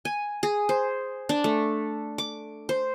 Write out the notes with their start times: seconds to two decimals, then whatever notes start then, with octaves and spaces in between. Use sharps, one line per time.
0.05 G#5
0.43 G#4
0.69 C5
1.29 D4
1.44 A3
2.18 D6
2.69 C5